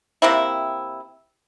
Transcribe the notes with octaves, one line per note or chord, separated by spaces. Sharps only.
C3 A#3 C4 E4